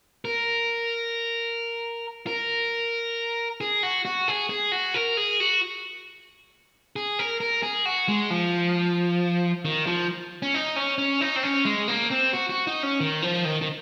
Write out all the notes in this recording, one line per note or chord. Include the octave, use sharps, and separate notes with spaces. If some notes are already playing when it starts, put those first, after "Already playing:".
A#4
A#4
G#4
F#4
F#4
G#4
G#4
F#4
A#4
G#4
F#4
G#4
A#4
A#4
G#4
F#4
G#3
F3
D#3
F3
C#4
D#4
C#4
C#4
D#4
C4
C#4
G#3
A#3
C4
F#4
F#4
D#4
C#4
D#3
F3
D#3
D#3